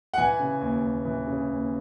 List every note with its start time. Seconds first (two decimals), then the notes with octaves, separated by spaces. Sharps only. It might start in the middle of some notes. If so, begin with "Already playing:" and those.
0.14 F#5
0.18 E3 G#5
0.40 C#3
0.61 D#2
0.83 D#2
1.05 E3
1.27 C#3
1.49 D#2